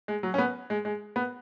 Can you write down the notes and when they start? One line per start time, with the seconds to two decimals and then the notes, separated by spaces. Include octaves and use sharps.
0.08 G#3
0.23 F#3
0.34 C#4
0.38 B3
0.70 G#3
0.85 G#3
1.16 B3